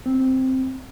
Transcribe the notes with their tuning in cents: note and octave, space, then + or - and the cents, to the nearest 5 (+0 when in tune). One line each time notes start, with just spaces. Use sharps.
C4 +0